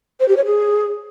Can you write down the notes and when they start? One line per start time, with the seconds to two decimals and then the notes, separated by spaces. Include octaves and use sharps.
0.20 C5
0.28 G4
0.37 C#5
0.45 G#4